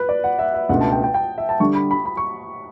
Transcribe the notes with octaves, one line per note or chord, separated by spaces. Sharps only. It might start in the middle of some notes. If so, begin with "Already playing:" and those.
Already playing: B4
D5
F#5
E5
E5
C#2 B2 A3 D4 F#5
A5
G5
G5
G5
E5
A5
D3 G3 D4 A4 C#6
B5
B5
B5
C#6